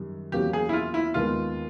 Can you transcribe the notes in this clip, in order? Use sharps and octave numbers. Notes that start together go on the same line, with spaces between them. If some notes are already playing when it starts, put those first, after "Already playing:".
Already playing: F#2 D#3 G3
E2 B2 F#3 A#3 C#4 G4
G#4
E4
F4
E4
D#2 D#3 G#3 B3 F4